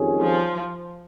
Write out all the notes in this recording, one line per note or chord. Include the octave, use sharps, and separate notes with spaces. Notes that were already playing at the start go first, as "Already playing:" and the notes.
Already playing: F2 D#3 G3 C#4 G#4
F3